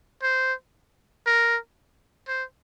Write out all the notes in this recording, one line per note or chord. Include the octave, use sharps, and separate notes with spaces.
C5
A#4
C5